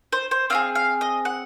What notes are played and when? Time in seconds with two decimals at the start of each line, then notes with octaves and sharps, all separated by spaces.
0.13 C5
0.31 C5
0.50 C4 F4 G#4 F5
0.75 F5
1.01 D#5
1.25 F#5